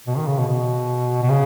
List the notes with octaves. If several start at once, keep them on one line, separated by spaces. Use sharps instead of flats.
B2
D#3
C#3
B2
B2
B2
C#3